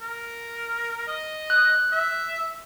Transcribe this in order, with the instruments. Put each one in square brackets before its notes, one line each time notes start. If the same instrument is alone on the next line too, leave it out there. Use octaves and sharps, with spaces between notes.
[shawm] A#4
D#5
[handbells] F#6
[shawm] E5